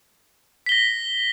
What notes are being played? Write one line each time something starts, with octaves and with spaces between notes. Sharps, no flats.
A#6 B6 G7